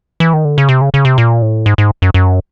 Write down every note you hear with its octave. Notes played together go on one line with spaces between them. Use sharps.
E3
D#3
D3
C#3
C3
C#3
C#3
C3
A#2
A2
G#2
G#2
F#2
F#2